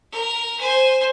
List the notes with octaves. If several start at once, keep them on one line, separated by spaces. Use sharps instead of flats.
A#4
C5 G#5